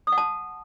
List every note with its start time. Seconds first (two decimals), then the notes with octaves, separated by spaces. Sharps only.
0.07 D#6
0.12 F#5
0.18 A5